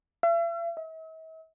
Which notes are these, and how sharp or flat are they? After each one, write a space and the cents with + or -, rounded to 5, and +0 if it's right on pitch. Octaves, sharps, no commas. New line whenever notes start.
E5 +45
E5 -45